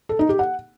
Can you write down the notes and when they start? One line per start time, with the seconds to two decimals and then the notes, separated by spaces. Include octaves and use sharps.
0.09 A4
0.19 D#4
0.29 G4
0.39 F#5